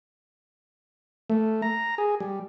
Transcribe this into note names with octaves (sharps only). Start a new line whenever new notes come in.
A3
A#5
G#4
G3